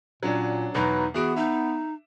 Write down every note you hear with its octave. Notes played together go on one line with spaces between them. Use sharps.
A#2 F#3 C#4 D4
E2 B2 F#3 D#4 B4
E3 B3 F#4 G#4 D7
D#4 E5